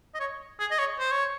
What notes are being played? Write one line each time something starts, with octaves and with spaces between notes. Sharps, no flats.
D#5
C#5
G#4
D#5
C#5
C5
C#5